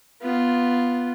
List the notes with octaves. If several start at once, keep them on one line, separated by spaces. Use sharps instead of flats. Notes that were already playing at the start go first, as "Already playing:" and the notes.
B3 F4